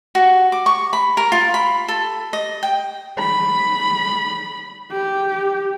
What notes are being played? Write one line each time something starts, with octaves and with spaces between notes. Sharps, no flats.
F#4
D6
C#6
B5
A#4
F4
B5
A4
D#5
G5
B5
G4